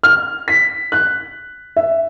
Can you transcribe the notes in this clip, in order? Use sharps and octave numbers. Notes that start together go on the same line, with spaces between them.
F6
B6
F#6
E5